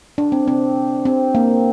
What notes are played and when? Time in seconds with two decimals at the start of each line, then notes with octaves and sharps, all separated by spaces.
0.18 D4
0.32 C4
0.48 C4
1.05 C4
1.35 A#3